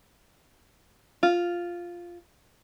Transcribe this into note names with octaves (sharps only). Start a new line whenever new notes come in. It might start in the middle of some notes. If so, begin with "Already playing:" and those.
F4